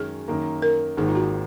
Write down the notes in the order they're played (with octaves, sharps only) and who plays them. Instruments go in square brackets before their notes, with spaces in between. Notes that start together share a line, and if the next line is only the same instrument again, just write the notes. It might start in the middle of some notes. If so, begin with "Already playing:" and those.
Already playing: [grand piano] F#2 D#3 G#3 C#4 [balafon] G#4
[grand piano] F#2 D#3 A#3
[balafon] A#4
[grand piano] G#1 G#2 D#3 A#3 [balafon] G#4
[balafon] F4
F#4